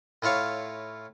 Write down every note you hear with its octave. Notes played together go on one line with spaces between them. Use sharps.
A2 E4 F4 C#5 F5